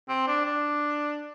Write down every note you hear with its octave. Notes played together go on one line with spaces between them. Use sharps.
C4
D4
D4